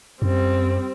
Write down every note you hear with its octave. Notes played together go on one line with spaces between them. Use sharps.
F#2 G3 C4